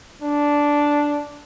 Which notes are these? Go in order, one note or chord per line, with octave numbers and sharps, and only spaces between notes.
D4